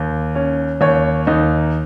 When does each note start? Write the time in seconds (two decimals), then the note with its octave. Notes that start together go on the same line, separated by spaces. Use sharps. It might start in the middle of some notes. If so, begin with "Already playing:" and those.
Already playing: D#2
0.35 C#4
0.81 D#2 C#5
1.27 D#2 D#4